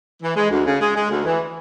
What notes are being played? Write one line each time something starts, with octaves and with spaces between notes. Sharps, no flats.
E3
G#3
D2
C#3
G#3
G#3
D2
E3